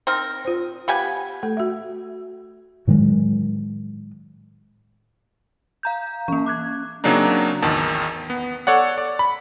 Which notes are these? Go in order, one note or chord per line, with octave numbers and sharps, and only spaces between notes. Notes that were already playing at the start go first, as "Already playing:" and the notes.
C4 D#4 A#4
F4 C5
B3 G4 F5 G#5
A3 A4
F#4 E5
A2 D#3 F#3 G#3
F5 A#5 G6
E3 A#3 C#4
D6 F#6 G#6
C#3 F#3 A#3 C4 D4 D#4
A1 E2 D#3 A5
B3
A4 C#5 D5 F#5
D5
B5